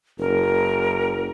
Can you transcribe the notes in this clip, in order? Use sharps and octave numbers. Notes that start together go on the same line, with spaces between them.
F#1 A#4